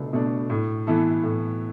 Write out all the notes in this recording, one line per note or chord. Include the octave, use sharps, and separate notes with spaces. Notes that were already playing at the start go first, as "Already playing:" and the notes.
Already playing: C#2 B2 A3 D4
B2 A3 D4
A2
E3 B3 E4 A4
A2